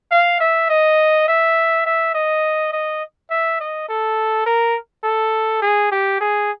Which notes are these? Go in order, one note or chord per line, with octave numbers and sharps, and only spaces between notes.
F5
E5
D#5
E5
E5
D#5
D#5
E5
D#5
A4
A#4
A4
G#4
G4
G#4